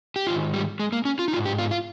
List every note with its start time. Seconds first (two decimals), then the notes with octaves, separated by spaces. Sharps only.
0.16 G4
0.27 G#2 D#3 F4
0.54 G3
0.80 G#3
0.92 A#3
1.05 C#4
1.19 F4
1.28 D#4
1.33 D#3 F4
1.36 G#2
1.46 G4
1.58 F4
1.71 F4